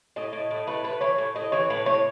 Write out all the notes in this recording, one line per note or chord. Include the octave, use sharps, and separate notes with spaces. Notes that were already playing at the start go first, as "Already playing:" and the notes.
A2 D#5
A2
A2
A3 B4
A2 B4
E3 C#5
A2
A2 D#5
E3 C#5
A2 B4
A2 C#5